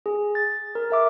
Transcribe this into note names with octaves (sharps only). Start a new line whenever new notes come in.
G#4
A6
A#4
A#4 E5 D6